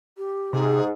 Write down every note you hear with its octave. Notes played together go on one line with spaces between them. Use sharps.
G4
G#2 C3 G#4